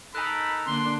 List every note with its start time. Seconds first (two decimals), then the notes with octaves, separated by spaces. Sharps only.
0.15 D#4 A4 A#4 G#5 B5 F#6
0.67 D3 A#3 D4 C6